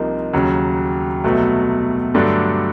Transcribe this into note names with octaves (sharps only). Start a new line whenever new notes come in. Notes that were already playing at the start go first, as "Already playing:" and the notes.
Already playing: C2 C3 F3 A#3 D#4
D#2 C#3 F#3
C2 B2 F#3 A3
G2 D3 F#3 A3 D4